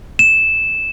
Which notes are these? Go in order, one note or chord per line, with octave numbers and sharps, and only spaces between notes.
E7